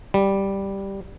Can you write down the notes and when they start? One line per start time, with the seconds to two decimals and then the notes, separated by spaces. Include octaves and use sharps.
0.14 G3